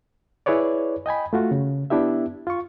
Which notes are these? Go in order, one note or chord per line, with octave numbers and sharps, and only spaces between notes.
E4 G#4 B4 C#5 D5
D#5 G5 G#5 B5
A3 F4 F#4
C#3
B3 D4 E4 G4 E5
F4 C#6